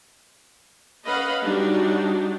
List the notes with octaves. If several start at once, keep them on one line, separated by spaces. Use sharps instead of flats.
C#4 B4 D#5 F5 F#5 B5
F#3 G3 D4 D#4 F#4